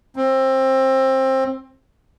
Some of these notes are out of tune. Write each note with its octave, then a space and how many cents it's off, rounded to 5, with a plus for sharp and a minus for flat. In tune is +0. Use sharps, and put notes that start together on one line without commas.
C4 +20